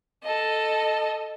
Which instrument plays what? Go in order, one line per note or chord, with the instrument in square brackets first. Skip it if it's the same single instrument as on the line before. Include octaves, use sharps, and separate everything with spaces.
[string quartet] A4 D#5